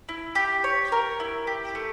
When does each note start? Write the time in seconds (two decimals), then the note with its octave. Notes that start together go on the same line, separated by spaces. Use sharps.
0.09 E4
0.35 G4
0.64 C#5
0.92 A#4
1.20 E4
1.47 G4
1.75 A3